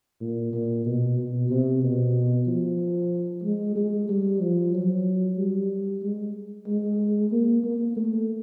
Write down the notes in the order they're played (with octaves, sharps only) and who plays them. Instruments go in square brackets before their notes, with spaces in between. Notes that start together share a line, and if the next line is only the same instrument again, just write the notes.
[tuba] A#2
A#2
B2
B2
C3
B2
F3
G#3
G#3
G3
F3
F#3
G3
G#3
G#3
A#3
A#3
A3